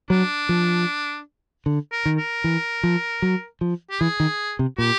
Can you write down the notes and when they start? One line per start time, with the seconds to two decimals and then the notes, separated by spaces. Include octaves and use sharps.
0.10 F#3 D4
0.49 F3
1.66 D3
1.92 A#4
2.06 D#3
2.18 A#4
2.44 E3
2.83 F3
3.22 F#3
3.61 F3
3.90 G4
4.01 E3 G#4
4.20 D#3
4.59 C3
4.78 A#2 G4